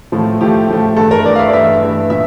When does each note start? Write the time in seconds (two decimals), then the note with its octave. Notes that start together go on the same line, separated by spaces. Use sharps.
0.12 A2 F3 A3
0.40 A2 F3 A3 G4
0.69 A2 F3 A3
0.96 G2 E3 A3 A4
1.11 A#4
1.25 G2 E3 A3 D5
1.35 F5
1.39 E5
1.48 D5
1.53 G2 E3 A3 E5
1.82 G2 E3 A3
2.10 A#2 E5